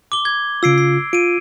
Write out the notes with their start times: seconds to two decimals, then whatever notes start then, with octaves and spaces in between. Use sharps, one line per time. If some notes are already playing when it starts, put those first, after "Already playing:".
0.12 D6 G7
0.25 G#6
0.63 C#3 F4 E6 C7 D7
0.78 C7
1.13 F4 D7 D#7